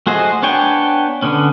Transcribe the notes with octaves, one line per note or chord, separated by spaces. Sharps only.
A3 F#4 G#4 C5 D#5
B3 D4 C#5 G5 G#5
D3 B3 C#4